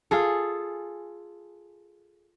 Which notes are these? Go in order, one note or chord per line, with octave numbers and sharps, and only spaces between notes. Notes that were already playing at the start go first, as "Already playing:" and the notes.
F4 G#4 A4